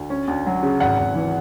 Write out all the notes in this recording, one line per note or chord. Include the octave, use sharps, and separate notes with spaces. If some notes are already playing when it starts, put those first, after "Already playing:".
Already playing: D2
C#4
D2
F#3
C#3
G#1 F#5
G#1
E3